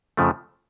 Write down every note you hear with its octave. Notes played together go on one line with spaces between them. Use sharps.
F2 C#3 F3 A3